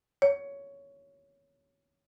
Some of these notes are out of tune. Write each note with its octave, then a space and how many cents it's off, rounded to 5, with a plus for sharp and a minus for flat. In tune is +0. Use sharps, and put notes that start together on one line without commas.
C#5 +10